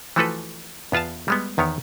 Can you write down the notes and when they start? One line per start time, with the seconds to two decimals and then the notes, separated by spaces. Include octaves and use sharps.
0.16 E3 F3 A3 F#4 A4 B4
0.92 E2 B3 F4 F5 A5
1.28 G3 G#3 B3
1.58 E2 D#3 B3 C#5